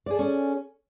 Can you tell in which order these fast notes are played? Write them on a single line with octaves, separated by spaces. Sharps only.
D5 G#4 A4 C#4